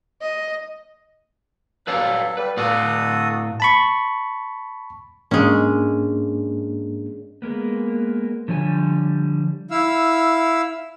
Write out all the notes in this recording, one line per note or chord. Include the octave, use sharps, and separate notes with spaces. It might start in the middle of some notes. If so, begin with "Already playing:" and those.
D#5
F#3 A4 B4 D5 F5
G3 B4
A2 F#4 A4 D5 F5 D#6
A5 B5 C#6
G#2 G#3 A#3 C#4 D4
G#3 A#3 B3
D3 F3 G3 C#5 G#5
E4 F5 E6